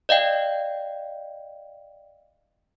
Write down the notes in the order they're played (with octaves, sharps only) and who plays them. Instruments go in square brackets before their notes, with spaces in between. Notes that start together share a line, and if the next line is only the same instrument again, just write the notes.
[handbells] D5 D#5 F5 G5